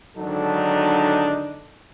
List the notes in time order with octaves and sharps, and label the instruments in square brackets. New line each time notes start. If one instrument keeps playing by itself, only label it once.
[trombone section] G#1 D3 F#3 D4 D#4 A4